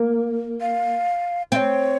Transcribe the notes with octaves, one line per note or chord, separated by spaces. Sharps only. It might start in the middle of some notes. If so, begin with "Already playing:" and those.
Already playing: A#3
F5
C4 C#5 F5